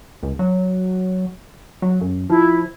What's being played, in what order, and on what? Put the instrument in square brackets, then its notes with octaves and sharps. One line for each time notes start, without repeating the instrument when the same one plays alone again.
[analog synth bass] C#2
F#3
F#3
F#2
[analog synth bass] F3 [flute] E4